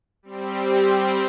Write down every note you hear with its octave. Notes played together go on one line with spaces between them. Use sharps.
G3 C4